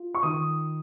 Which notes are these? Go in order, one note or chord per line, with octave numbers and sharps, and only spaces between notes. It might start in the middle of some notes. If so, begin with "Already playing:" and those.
Already playing: F4
C#6
D#3 D#6